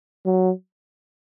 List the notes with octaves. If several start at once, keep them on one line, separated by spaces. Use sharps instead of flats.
F#3